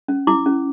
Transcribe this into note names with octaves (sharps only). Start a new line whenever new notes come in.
C#4
E4 D6
C#4